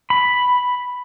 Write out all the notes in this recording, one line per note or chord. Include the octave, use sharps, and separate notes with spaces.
B5